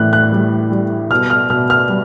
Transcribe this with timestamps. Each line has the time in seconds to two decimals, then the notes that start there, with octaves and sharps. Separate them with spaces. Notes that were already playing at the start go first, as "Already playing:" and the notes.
Already playing: A2 E3 F#6
0.13 F#6
0.32 G3
0.71 G3
1.10 B2 F6
1.30 F6
1.50 B2 F6
1.70 F6
1.89 G3